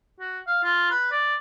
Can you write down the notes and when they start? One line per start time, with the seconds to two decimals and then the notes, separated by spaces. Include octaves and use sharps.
0.19 F#4
0.47 F5
0.63 F4
0.90 B4
1.11 D5